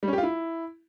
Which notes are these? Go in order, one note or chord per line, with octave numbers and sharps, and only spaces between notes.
G3
C#4
G4
F4
E4